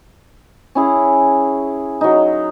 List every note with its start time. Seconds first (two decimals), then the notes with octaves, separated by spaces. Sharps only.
0.75 C#4 E4 G#4
2.01 F#3 D#4